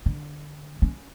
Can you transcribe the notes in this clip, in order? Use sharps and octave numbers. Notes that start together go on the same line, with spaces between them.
D3
C#4